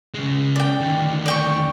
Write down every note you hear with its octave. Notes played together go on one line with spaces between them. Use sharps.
C#3 G#3
D5 G5
D2 D#3
D5 G5 C#6